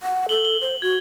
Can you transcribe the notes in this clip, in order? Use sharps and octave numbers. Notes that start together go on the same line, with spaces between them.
F#5
A4 F#7 G7
G7
C5
F#4 G#6